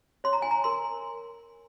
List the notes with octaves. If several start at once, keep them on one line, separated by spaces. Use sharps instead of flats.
C#5 C6
A#5
G#5
A#5
A#4 C6